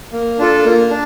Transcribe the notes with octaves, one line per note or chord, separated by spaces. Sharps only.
A#3
D4 F4 A4
A#3
D4